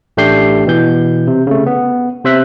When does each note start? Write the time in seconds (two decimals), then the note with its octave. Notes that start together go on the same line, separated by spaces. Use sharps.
0.17 A1 A3 D4 G4 G6 C7
0.67 B2 E3 G6
1.27 C3
1.47 C#3 A3
1.66 B3
2.24 C3 C5 E5 F#6 B6